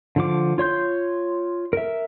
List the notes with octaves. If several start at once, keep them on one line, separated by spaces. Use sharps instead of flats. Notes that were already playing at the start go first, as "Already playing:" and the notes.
D3 F3 D6
F4 C#5 C6 G6
A#4 E5